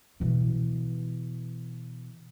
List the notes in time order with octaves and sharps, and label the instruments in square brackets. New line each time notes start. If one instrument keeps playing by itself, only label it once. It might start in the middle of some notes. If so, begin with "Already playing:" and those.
[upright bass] B2 E3